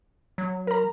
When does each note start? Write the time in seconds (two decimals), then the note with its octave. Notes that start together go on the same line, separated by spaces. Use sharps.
0.38 F#3
0.67 A#4 A#5